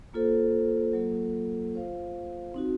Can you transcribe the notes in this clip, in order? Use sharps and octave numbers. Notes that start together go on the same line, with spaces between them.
A#3 F4 A4 C5
F#3 A#3 F4 A4
F4 C5 F5
C4 D#4 F#4